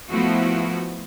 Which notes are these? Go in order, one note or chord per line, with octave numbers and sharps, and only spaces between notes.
F3 A3 B3 E4 F#4